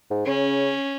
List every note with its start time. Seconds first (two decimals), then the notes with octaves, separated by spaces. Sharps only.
0.11 G#2
0.26 C#3 C#4